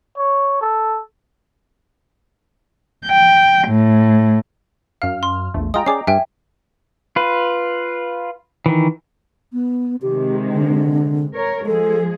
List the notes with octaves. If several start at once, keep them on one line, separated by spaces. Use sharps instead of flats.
C#5
A4
G5
A2
F#2 F5 F6
C6
A#1 E2 A3
G#3 F4 D#5 G5 A#5 D#6
C#4 G#4 D5 D6 C7
G2 E5 G5 G#5
F4 B4
D#3 E3
B3
C3 D#3 G#3 G4
D3
A#4 C#5
F3 G#3 G#4 A4